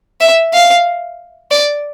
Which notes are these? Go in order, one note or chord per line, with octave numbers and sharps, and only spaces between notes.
E5
F5
D5